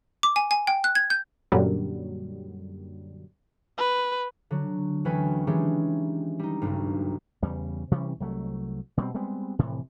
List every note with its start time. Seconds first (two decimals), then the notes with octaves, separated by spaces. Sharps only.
0.23 D6
0.36 G#5
0.51 G#5
0.67 G5
0.84 F#6
0.95 G#6
1.10 G6
1.52 F#2 A#2 D3 F#3 G3
3.78 B4
4.51 D3 F#3
5.05 D2 E3 C#4 B4 G5 G#5
5.47 D#3 E3 G#3 C#4 D4 G4
6.39 G3 D#4
6.62 F#1 B1 G2
7.43 E2 C#3 G3
7.91 C3 E3 G3 C#4
8.20 C2 F#3 A3
8.97 B2 G3 A#3 C4
9.14 G3 G#3 B3 C4
9.59 F1 A2 C3 E3